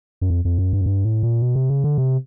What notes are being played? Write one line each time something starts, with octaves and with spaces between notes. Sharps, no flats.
F#2
F2
F2
F#2
G2
F#2
G2
A2
A#2
B2
C3
C#3
D3
C3